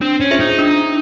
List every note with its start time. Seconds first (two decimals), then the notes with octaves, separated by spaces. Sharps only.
0.01 C4 D4
0.21 C#4
0.31 F4 G#4 C5 E5
0.40 D#4
0.59 D4